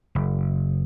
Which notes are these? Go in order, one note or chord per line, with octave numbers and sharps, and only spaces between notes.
F#1